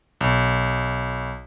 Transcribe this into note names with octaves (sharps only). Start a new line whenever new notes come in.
B1